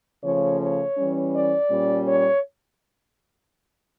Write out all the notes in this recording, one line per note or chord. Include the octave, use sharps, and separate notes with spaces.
C#3 F3 A3 C#5
C#5
E3 G3 C#4
D5
A#2 G3 C#4
C#5